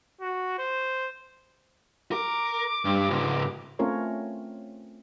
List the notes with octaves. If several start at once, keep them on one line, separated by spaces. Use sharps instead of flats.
F#4
C5
A#4 D6
G2
C#2 G#2
A3 C4 C#4 F4 A#4 C#5